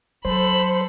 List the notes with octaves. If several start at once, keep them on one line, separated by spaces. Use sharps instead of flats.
F#3 A4 C5 B5